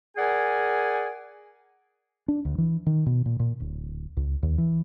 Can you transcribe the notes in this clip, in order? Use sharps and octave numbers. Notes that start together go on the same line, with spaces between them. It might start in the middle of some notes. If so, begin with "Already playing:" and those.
G#4 A#4 D5 F#5 G#5
D4
D2
E3
D#3
B2
A#2
A#2
D1
C#2
D#2
E3